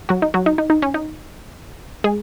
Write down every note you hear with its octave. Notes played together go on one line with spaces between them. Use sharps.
F#3 F#4
D#4
F#3 F#4
D#4
D#4
D#4
C#4
D#4
G#3 G#4